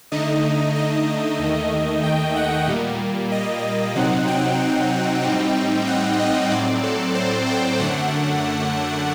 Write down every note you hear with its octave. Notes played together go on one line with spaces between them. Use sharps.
D3 A3 D#4 D#5
D#5
D#2 D#3 A3
G5
F#5
A#2 G3 A#3
D#5
C3 F#3 C4 D#4 F#5
G5
A2 G3 C4 D#4
F#5
D#5
A2 F#3 C4 D5
A4
C5
G5
F#2 D3 A3 D4 F#5